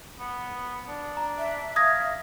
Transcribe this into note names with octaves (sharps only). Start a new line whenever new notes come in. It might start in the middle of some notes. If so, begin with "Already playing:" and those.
B3
D4
A#5
E5
F5 D#6 G#6 A#6